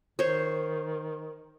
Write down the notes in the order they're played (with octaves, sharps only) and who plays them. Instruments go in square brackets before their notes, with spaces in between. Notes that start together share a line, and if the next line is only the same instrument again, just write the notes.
[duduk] D#3 [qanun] C5 C#5